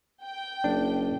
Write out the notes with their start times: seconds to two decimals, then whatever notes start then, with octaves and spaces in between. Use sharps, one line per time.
0.22 G5
0.64 F#1 D4